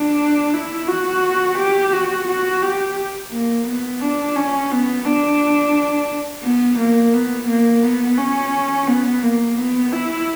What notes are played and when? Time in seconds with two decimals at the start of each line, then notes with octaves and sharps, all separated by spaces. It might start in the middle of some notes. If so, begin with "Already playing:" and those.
Already playing: D4
0.54 E4
0.89 F#4
1.59 G4
1.93 F#4
2.28 F#4
2.63 G4
3.32 A#3
3.67 B3
4.01 D4
4.36 C#4
4.71 B3
5.06 D4
6.44 B3
6.79 A#3
7.14 B3
7.49 A#3
7.83 B3
8.18 C#4
8.88 B3
9.23 A#3
9.58 B3
9.93 E4